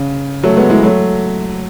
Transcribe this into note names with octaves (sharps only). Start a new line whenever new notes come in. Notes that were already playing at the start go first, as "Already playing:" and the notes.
Already playing: C#3
F#3 A3
G#3 B3
E3 G#3
F#3 A3